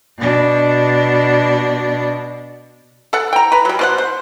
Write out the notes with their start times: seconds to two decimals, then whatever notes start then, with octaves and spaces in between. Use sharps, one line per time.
0.18 B2 D4
3.13 A4 F#5
3.33 G5 A#5
3.52 B4 A#5
3.65 F#3 G3
3.79 B2 C5 F#5
3.98 C5